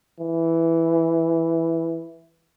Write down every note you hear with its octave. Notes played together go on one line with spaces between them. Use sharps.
E3